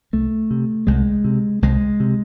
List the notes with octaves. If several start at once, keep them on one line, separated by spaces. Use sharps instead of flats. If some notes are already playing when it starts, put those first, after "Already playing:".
C2 A3
C3
C2 G#3
C3
C2 G#3
C3